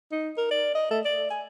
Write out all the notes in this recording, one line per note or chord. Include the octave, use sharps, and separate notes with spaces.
D#4
A#4
D5
D#5
A3
D5
G#5